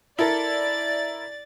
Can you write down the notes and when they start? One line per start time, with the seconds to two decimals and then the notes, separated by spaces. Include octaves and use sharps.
0.19 E4 A4 A#4 D5 A6